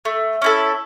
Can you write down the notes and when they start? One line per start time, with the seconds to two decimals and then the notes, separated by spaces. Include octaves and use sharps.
0.05 A3
0.42 C#4 E4 A4